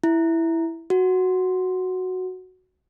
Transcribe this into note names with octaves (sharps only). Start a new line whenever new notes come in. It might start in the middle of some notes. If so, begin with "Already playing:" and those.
E4
F#4